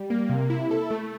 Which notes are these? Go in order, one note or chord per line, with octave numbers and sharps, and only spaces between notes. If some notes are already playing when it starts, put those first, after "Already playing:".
Already playing: G3
A#3
C3
E4
A4
A3